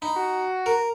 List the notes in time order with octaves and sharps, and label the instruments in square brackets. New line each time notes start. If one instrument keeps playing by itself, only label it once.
[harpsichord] D#4 [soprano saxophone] B5
[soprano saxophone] F#4
[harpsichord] A#4